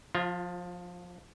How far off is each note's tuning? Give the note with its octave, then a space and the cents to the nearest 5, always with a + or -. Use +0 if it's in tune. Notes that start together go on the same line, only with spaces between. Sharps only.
F3 +25 F4 -10 A#5 -5